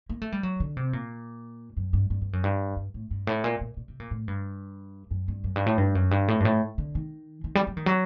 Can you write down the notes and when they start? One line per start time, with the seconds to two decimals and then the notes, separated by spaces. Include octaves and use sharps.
0.09 A#3
0.22 A3
0.32 G3
0.43 F#3
0.60 D3
0.77 C3
0.93 A#2
1.77 F#2
1.93 G2
2.10 G2
2.22 G2
2.33 F#2
2.44 G2
2.76 G2
2.94 A2
3.11 G2
3.27 A2
3.44 A#2
3.61 A#2
3.77 A#2
3.88 C3
4.00 A#2
4.11 A2
4.28 G2
5.11 F#2
5.28 G2
5.44 F#2
5.56 G2
5.66 A2
5.78 G2
5.95 F#2
6.11 G2
6.28 A2
6.40 G2
6.45 A2
6.78 D3
6.95 D#3
7.44 D#3
7.55 G3
7.67 F#3
7.77 D#3
7.86 F#3